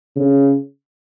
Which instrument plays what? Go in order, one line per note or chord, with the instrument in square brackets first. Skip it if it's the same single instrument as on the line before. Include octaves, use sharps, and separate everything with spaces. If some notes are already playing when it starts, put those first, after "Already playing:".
[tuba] C#3